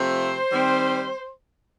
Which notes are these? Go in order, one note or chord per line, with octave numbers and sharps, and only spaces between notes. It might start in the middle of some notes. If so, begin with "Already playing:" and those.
Already playing: C3 F3 A3 C4 C5
D#3 G3 C4